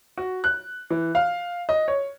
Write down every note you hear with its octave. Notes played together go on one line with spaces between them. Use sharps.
F#4
F#6
E3
F5
D#5
C#5